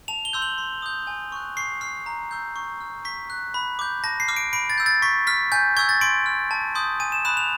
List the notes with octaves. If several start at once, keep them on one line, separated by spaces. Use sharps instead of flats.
A5 F7
G7
C6 E6 G6
F#7
C6
D#6 G6
G#5
C#6 F#6
C#6 C7
F6 C7
A#5
C#6 E6 G6
C#6
F6
C#6 B6
F#6
B5
D6 G6
A5 A#6
C7
D6 F6
D7
B5 D7
A6
E6 G6
A6
C#6 B6
F6 B6
G#5 G6
C#6 E6 G6 G#6
A6
C6 D7
F6
A5
C6 D#6 G6
G#5 D#7
E7
B5 D#6 F#6 E7
F7